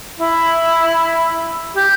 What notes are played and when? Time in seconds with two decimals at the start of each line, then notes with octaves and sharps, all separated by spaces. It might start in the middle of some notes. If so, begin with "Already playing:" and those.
0.18 E4
1.74 G4